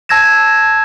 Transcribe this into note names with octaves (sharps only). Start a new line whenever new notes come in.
A5 E6 G#6 A#6 E7